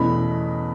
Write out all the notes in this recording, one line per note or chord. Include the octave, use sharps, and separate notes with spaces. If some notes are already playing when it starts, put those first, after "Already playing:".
Already playing: E2 B2 A3 C#4 E4 B5